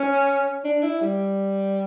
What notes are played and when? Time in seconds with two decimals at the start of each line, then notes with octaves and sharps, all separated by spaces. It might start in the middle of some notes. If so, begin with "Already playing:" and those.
Already playing: C#4
0.65 D4
0.83 E4
1.01 G3